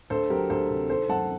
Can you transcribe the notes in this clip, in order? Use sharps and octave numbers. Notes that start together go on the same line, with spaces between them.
D2 A4 C5
F#3 G4 A#4
D2 A4 C5
C3
D#3 A4 C5
F#2 F#5 A5